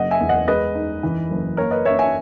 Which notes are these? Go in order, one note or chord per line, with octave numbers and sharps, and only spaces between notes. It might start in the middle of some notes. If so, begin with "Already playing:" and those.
Already playing: F#1 C#3 D#5 F#5
E5 G#5
E2
D#5 F#5
G#3 B4 D#5
D#4
E3
F#1
A#3 A#4 C#5
B4 D#5
A#3 C#5 E5
E5 G#5